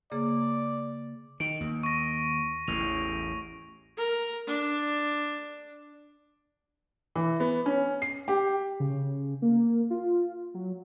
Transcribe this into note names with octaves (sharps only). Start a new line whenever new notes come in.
C#3 A#3 G#4 D5
D#3 D7
D#2
C#6 A#6
A1 E2 A2 F7
A#4
D4
E3
B3
C#4
C7
G4
C#3
A#3
F4
F#3